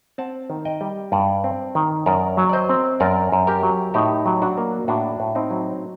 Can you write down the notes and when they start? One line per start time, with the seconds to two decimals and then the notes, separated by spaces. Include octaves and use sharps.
0.18 C4 F#5 A5
0.50 D#3
0.65 D#5 G5
0.81 G3
1.12 G2 D5 F#5
1.44 C4
1.75 D#3
2.06 F#2 A#4 D5
2.37 F#3
2.49 D5
2.53 C5 D#5
2.69 C4
3.00 F#2 A#4 D5
3.32 F#2
3.47 G4 A#4
3.63 F#3
3.94 A2 D#4 G4
4.26 F#3
4.42 D4 F#4
4.58 A#3
4.88 A2 D4 F#4
5.20 A2
5.35 C4 D#4
5.51 F#3